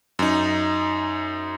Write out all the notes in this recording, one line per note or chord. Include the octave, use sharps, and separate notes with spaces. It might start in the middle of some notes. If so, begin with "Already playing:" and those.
F#2 D#4